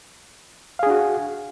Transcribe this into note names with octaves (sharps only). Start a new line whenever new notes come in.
D4 F#4 G#4 F5